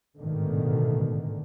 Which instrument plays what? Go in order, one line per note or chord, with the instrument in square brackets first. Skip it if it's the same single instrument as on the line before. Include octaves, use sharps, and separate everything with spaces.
[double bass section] A1 G#2 B2 D3 D#3 A3